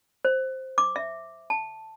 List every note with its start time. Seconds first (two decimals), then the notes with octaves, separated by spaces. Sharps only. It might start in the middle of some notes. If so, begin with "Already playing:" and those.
0.25 C5
0.78 D6
0.96 E5
1.50 A5